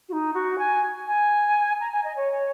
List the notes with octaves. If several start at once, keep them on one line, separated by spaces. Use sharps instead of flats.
F#4
D#4
F#4
G#5
G#5
A#5
G#5
D#5
C#5